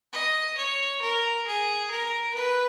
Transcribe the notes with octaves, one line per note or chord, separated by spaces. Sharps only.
D#5
C#5
A#4
G#4
A#4
B4